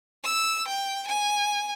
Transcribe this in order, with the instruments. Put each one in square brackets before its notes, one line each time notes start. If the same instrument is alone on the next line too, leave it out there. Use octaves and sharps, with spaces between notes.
[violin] E6
G5
G#5